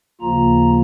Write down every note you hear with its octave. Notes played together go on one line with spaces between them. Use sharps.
D#2 C#3 F3 A#3 F4 A#5